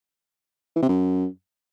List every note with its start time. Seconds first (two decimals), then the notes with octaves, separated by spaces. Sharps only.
0.76 E3
0.82 C3
0.89 F#2